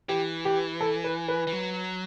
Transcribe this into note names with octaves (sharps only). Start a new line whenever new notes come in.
E3 G4
G4
A4
B4
B4
E3
F#3